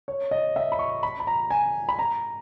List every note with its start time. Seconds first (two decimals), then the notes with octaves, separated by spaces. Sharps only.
0.08 C#5
0.31 D#5
0.56 E5
0.72 B5
0.79 C#6
1.03 B5
1.20 B5
1.27 A#5
1.51 G#5
1.89 B5
1.99 A#5